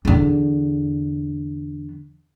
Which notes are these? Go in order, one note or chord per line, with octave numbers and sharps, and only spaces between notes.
E2 D3